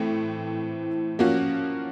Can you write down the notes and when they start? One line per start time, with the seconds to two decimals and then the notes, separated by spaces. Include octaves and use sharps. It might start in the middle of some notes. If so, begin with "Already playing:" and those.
Already playing: A2 E3 A3 C4
1.19 F3 A#3 C#4 F#4